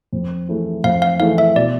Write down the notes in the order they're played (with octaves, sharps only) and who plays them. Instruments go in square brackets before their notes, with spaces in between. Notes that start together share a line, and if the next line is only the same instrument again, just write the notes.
[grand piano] F2
E3 A3 E4 G#4
[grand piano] F2 [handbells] F5
[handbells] F5
[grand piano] E3 A3 E4 G#4 [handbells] F5
[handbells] E5
[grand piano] B2 [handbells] D5